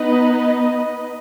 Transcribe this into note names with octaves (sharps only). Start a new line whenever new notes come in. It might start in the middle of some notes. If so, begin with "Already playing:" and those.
Already playing: B3 D#4 B4 D#5